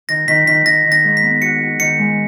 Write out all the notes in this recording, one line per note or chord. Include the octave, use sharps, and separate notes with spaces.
D#3 A#6
D#3 B6
D#3 B6
D#3 A#6
D#3
A#6
G#2
B6
B3
F#4 C#7
F#4
D#3 C#7
G#3